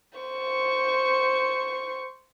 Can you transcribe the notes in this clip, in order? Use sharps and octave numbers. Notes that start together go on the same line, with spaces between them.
C5 C#6